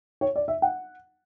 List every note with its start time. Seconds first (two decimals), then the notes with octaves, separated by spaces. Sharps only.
0.21 C#5
0.36 D5
0.48 E5
0.62 F#5